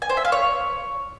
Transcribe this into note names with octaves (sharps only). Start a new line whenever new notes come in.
G#5
C5
E5
F5
C#5